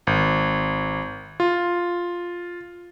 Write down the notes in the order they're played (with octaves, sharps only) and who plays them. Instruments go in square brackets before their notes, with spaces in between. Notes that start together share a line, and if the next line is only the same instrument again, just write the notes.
[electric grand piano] G#1
F4